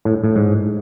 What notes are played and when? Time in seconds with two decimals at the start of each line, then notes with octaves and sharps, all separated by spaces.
0.05 A2
0.24 A2
0.36 G#2